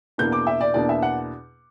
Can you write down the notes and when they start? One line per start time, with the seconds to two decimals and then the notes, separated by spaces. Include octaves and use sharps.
0.18 E2 B2 A#3 D4 G6
0.32 D6
0.47 E5
0.61 D5
0.74 E2 B2 A#3 D4 D5
0.89 E5
1.02 F#5